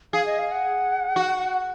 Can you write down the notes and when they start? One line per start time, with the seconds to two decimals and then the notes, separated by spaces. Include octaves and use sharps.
0.13 G#4 F5
0.26 D#5
0.39 F5
0.52 F#5
1.16 F#4